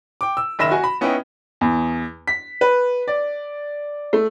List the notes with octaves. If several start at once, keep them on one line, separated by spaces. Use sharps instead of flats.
G5 D6
E6
F#1 D#3 E5 B5 A#6 E7
F#4 G#5
B5
B3 C#4 D#4 E4 B4 G5
E2
B6
B4
D5
A3